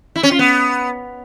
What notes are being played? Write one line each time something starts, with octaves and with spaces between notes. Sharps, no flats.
E4
C#4
F4
B3